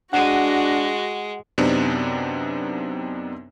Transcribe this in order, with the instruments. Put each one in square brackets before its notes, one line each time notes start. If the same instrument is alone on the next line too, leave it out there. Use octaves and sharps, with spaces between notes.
[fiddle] G#3 [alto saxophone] D4 [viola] F#4 [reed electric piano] F#5
[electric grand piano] F#2 C3 B3 C4 D4 D#4